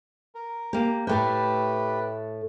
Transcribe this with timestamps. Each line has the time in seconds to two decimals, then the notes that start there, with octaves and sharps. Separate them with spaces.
0.35 A#4
0.73 A#3 G4
1.07 A2 A3 G4 B4 G5